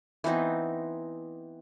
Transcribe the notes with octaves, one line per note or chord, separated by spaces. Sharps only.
E3 B3 C4 D#4